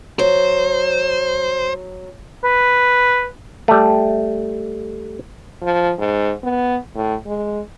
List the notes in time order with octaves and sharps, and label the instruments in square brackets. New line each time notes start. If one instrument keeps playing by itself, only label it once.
[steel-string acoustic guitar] F#3 [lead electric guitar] C5
[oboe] B4
[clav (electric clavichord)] G3 A3
[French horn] F3
G#2
B3
A2
G#3